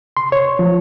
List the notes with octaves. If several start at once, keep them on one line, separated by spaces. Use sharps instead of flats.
C6
C#5
F3